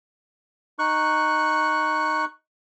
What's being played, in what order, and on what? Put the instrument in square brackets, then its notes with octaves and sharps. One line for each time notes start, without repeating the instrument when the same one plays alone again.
[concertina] D#4 C#6 F#6